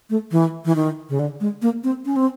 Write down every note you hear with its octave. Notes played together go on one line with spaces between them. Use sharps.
A3
E3
E3
D#3
C#3
D3
G#3
A#3
C4
C#4
C4